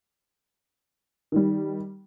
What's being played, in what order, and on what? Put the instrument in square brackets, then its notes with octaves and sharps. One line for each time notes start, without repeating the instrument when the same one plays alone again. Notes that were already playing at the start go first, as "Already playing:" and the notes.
[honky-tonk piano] D#3 G3